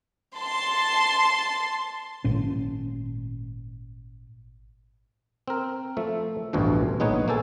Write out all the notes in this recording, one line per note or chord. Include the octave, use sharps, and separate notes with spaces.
A5 C6
G#1 A#2 C#4
C4 A#4
F3 A3 E5
A1 D2 G2 B2 F3
A#1 G#3 B3 D#4 B4 C#5
A#3 G4 A4 G#5